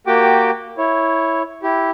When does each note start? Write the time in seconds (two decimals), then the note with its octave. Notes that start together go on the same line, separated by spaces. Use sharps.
0.07 A#3 F#4 G4 G5 D6
0.78 E4 C#5
1.63 E4 G4